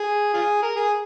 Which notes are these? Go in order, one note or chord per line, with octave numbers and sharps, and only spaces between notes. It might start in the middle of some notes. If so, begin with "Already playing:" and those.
Already playing: G#4
F4 G#4
A#4
G#4